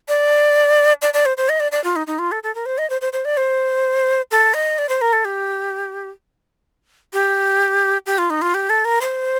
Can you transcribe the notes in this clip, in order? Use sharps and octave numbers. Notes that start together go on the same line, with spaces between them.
D5
D5
D5
C5
C5
D#5
D5
D5
F4
D#4
D#4
F4
A4
A4
A#4
C5
D#5
C5
C5
C5
D5
C5
A4
D#5
D5
C5
A#4
A4
G4
G4
G4
F4
D#4
F4
G4
A4
A#4
C5